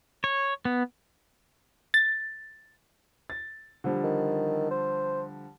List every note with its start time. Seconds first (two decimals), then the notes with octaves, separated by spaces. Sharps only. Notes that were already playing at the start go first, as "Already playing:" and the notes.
0.24 C#5
0.65 B3
1.94 A6
3.30 A6
3.84 D3 F3 G3
4.04 D#3
4.71 C5